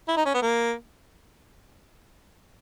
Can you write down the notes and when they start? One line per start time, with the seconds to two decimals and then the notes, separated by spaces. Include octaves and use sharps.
0.08 E4
0.17 D#4
0.26 C#4
0.34 B3
0.42 A#3